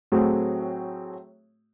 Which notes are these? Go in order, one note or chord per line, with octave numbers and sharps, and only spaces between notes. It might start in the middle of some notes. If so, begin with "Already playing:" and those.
A2 F#3 A3 C4 F#4 G#4